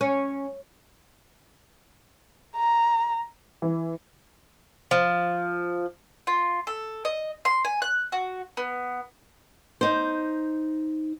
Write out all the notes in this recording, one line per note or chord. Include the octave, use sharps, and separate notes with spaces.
C#4
A#5
E3
F3
F4
A4
D#5
C6
G#5
F#6
F#4
B3
D#4 C5